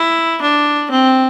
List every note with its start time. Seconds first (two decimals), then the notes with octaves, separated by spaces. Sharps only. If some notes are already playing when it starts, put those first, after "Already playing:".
Already playing: E4
0.42 D4
0.91 C4